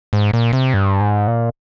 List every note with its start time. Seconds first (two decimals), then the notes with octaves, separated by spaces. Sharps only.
0.13 G#2
0.33 A#2
0.53 C3
0.74 G2
1.00 G#2
1.27 A#2